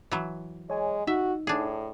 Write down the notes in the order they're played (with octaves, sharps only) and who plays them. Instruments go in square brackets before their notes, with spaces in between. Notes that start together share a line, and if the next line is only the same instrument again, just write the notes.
[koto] E3 F#3
[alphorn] G#3 [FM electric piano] C#5 G#5
[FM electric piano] D#4 [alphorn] F#4 [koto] E5
[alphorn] A2 [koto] D4 G#4